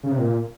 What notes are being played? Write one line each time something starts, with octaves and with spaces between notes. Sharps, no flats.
C#3
C3
A#2